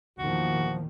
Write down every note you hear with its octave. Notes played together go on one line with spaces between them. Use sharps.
E2 A#2 D#3 F3 F#4